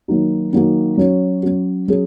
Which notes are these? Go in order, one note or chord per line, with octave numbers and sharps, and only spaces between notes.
D#3 F#3 A#3 D#4 F#4
D#3 F#3 A#3 D#4 F#4
F#3 C#4 F#4
F#3 C#4 F#4
F#3 C#4 G#4